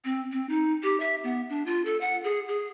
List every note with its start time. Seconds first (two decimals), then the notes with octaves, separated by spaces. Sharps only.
0.05 C4
0.32 C4
0.49 D#4
0.83 G4
1.00 E5
1.24 B3
1.50 D4
1.66 F4
1.85 A4
2.01 F#5
2.24 G#4
2.48 G#4